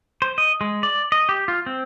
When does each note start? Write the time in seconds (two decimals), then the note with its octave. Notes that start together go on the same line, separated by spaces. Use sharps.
0.22 C5
0.38 D#5
0.61 G#3
0.83 D5
1.12 D#5
1.29 G4
1.48 F4
1.66 C4